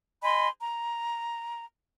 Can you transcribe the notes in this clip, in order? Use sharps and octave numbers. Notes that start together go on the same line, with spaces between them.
D#5 G#5 B5 C6
A#5